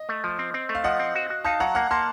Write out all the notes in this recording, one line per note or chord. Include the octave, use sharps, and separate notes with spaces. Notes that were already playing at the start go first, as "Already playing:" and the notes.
Already playing: D#5
A3
F3
C4
C4
A3
F5
F3 D#5 F#5
C4
F#4
F#4
D#4 F5 A5
F#3 F#5 A#5
A#3 F#5 A#5
A#3 A5 C6